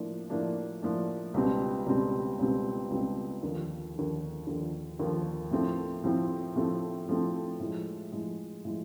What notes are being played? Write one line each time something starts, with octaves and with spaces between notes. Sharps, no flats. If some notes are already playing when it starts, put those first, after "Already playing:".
Already playing: A2 F3 A#3 D4
A2 F3 A#3 D4
A2 F3 A#3 D4
C#2 B2 G3 C4
C#2 B2 G3 C4
C#2 B2 G3 C4
C#2 B2 G3 C4
D#2 D3 F3
D#2 D3 F3
D#2 D3 F3
D#2 D3 F3
A2 F3 A3 C4
A2 F3 A3 C4
A2 F3 A3 C4
A2 F3 A3 C4
A2 F3 G#3
A2 F3 G#3
A2 F3 G#3